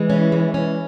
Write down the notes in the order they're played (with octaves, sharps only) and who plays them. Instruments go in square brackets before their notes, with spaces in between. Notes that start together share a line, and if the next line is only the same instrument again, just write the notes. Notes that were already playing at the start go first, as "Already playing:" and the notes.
Already playing: [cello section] E3 [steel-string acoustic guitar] G#3
[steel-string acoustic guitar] C#4
G#3
C#4